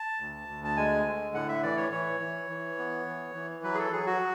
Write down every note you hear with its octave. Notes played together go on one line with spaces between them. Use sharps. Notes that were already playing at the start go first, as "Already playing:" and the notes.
Already playing: A5
D2
D2
A5
G#3 G#5
D3
A2 F#5
E5
E3 D5
C#5
E3 C#5
E3
E3
B3
E3
E3
F#3 B4
G#4
A4
F#3 G#4
F#4